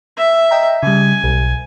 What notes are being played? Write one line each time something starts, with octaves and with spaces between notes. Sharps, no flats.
E5
D#5 G5 A#5
C#3 G3 G#5
B1